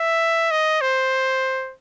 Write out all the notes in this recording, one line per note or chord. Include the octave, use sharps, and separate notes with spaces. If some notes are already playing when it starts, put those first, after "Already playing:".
Already playing: E5
D#5
C5